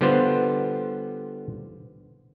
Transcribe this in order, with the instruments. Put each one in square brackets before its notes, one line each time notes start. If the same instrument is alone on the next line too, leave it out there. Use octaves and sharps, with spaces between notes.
[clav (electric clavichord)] D3 G3 B3 F4 C5